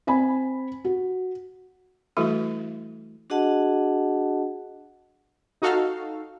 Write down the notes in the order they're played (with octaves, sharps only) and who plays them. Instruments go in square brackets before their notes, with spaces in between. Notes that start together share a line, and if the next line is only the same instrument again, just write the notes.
[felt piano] C4 G#5 B5
F#4
[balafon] E3 G3 A3 E4 F#4 A4
[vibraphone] D4 F#4 G#4 D#5 F#5 A5
[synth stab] D#4 F#4 A4 F5